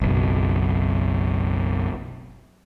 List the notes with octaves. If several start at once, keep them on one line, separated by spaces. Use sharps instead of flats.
F#1 B1